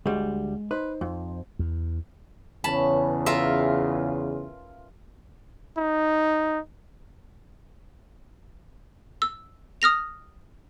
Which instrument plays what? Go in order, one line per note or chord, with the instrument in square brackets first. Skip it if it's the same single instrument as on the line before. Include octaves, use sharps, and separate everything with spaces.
[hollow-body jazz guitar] D2 G3 [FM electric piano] G#3
[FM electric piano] D#4 C5 [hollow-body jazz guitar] B4
[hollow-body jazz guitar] F2
[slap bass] E2
[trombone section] E2 C#3 [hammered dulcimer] C#4 B4 [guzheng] A5 B5
[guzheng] F4 A#4 E5
[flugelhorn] D#4
[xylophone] E6
D#6 F6 A#6 F7